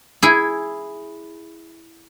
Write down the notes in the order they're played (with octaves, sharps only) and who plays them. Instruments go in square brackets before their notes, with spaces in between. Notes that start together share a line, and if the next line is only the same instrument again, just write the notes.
[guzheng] E4 G#4